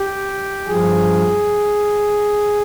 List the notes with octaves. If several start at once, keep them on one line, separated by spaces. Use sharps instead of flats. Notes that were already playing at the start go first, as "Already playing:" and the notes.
Already playing: G4
G2 F3 G#4